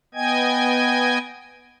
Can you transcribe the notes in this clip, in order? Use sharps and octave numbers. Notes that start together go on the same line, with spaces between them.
B3 D#5 G5 G#5 G#6